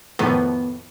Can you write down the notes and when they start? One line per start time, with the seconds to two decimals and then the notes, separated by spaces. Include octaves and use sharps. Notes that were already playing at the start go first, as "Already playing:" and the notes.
0.19 F2 A2 D#3 B3